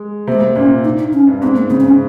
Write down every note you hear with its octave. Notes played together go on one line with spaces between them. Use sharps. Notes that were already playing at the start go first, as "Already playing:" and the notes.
Already playing: G#3
C3 A#3
G#3
A#3
A#2 C#4
D#4
D#4
C#4
G2
G#2 C4
A#3
C#3 C4
C4
C#4